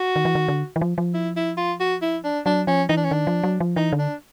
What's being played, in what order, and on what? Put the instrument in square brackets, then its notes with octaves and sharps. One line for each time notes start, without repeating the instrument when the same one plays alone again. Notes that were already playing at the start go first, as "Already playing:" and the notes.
Already playing: [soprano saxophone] F#4
[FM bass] D#3
E3
D#3
D3
E3
F3
F3
[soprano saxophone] E4
E4
F4
F#4
E4
D4
[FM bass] F#3 [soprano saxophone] D4
[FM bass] F3 [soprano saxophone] C#4
[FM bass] E3 [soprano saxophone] D#4
[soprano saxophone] D4
C#4
[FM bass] D#3 [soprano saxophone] D4
[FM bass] F3
F#3
F3
[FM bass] E3 [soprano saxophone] D#4
[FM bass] D3
[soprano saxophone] D4